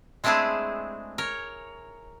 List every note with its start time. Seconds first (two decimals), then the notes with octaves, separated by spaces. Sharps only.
0.24 G#3 A3 C4 D4 E4 G#4
1.18 A#4 C#5